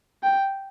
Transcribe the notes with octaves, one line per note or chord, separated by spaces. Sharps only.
G5